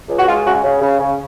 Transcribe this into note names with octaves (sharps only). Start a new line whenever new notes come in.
C#2
F#4
G#3 F4
C#3 F#4
C#3
C#3
C#3